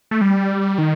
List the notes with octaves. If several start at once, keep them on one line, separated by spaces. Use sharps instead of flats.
A3
G3
D#3